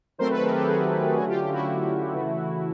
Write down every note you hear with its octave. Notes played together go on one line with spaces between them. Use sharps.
D#3 F#3 A3 C4 A#4 C5
A4 B4
G#4 A#4
G4 A4
F#4 G#4
D3 F#3 A3 C#4 F#4 G#4
F4 G4
F4 G4
E4 F#4
C#3 E3 A3